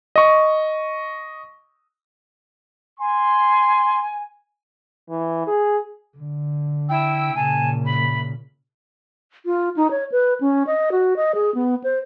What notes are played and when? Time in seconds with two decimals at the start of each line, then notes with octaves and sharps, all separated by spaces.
0.16 D#5 C#6
2.99 G#5 C6
5.10 E3
5.47 G#4
6.18 D3
6.88 E4 G5 E6
7.34 A#2 C#3 G#5 A5
7.83 E5 B5
9.46 F4
9.77 D#4
9.91 C#5
10.12 B4
10.41 C#4
10.67 D#5
10.92 F#4
11.16 D#5
11.35 G#4
11.55 B3
11.84 C5